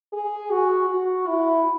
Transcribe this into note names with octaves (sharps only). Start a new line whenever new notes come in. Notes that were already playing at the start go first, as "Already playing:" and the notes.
G#4
F#4
F#4
E4